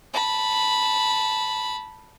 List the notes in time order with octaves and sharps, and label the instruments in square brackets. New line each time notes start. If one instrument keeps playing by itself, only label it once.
[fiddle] A5 B5